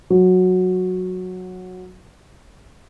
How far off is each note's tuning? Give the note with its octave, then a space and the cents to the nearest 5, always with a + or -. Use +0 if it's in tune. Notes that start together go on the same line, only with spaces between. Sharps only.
F#3 -10